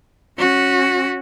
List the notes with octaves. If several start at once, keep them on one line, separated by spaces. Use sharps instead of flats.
C#4 F#4